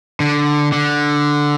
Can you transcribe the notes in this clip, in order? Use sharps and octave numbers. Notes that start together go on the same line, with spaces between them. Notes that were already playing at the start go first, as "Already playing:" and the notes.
D3
D3